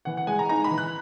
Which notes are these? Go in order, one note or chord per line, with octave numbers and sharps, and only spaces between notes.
E3 F#5
F#5
G#3 G#5
A#5
D#4 A#5
B5
E3
F#6